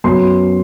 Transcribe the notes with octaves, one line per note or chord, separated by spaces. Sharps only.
F#2 F#3 B3 C6